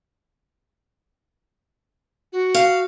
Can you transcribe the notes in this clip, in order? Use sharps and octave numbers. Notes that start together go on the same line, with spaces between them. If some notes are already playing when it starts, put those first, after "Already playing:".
F#4
F5